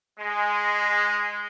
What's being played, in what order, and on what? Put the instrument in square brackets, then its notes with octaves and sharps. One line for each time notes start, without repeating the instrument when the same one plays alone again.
[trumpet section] G#3